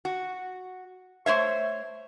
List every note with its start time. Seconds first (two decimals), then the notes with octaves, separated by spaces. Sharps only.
0.05 F#4
1.26 A3 C5 C#5 E5